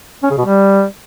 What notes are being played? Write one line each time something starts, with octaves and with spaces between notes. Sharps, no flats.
C#4
C#3
B2
G3